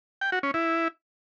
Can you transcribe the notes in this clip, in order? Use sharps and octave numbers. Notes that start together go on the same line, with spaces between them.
G5
F#4
C#4
E4